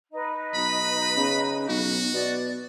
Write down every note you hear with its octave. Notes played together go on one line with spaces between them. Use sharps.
D#4 B4 D#5
B1 B5
C#3
B1 F#4
B2 D5